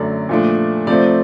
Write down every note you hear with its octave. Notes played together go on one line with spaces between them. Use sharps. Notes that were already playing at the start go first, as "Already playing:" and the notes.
Already playing: F#2 D3 F#3 A3 D5
A#2 F3 A3 D4
C3 F3 A3 C4 D5